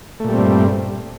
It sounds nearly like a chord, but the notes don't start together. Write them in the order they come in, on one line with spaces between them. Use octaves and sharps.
A3 A#2 G3 C4 G2